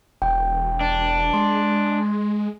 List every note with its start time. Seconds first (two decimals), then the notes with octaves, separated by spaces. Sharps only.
0.22 E1 G5
0.81 D4
1.33 G#3 C6